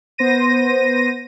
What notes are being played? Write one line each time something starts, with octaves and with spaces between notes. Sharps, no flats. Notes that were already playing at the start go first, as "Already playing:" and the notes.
B3 C5 A#6 D#7